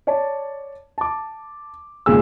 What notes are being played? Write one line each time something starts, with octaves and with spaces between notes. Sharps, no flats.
C#5 D5 A5
A5 D6
G#1 A#2 C#3 G#4 E6